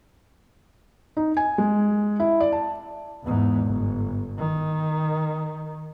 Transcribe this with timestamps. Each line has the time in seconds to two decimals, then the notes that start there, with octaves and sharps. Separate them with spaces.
1.17 D#4
1.37 G#5
1.58 G#3
2.20 E4
2.40 D5
2.52 A5
3.23 E2 G#2
3.66 G1
4.38 D#3